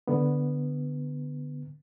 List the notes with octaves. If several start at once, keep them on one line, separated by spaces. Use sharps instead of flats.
D3 B3